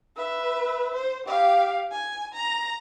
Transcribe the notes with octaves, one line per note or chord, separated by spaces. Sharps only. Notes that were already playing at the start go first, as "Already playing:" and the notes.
B4 E5
C5
G4 F5
G#5
A#5